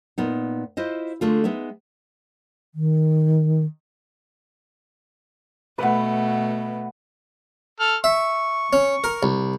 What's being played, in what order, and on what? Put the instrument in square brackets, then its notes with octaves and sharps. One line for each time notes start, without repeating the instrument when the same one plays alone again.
[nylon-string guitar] A#2 B3 D#4
E4 F4 C5 D#5
D3 G#3 A3 F4
G#3 B3 D#4 E5
[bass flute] D#3
[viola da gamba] B2 A3 [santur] B4 F#5
[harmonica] A4 F6
[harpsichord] E5 [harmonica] C#6
[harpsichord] C#4
A#4
C2